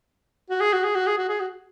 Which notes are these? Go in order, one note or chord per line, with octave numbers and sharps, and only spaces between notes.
F#4
G#4
F#4
G#4
F#4
G#4
F#4
G#4
F#4